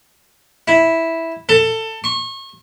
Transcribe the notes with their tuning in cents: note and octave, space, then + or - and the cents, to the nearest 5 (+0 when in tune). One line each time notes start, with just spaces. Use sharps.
E4 -5
A4 +20
C#6 -35